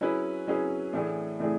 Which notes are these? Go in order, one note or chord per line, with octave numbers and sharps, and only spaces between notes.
F#3 C#4 E4 G#4 B4
F#3 C#4 E4 G#4 B4
A2 E3 A3 D4 G#4
A2 E3 A3 D4 G#4